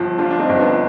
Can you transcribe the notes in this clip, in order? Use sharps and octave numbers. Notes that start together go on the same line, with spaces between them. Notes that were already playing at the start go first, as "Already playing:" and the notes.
Already playing: G1 F3
F3 D4 F4
D4
C4 D#4
G1
B3 D4